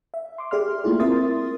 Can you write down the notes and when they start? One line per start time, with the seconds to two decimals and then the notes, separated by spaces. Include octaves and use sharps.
0.14 E5
0.38 C6 D6
0.51 G4 G#4 D5 E5 C6 F6
0.84 A3 A#3 E4 F4 G#4
1.00 C4 A#4 E5 C6 D#6 A6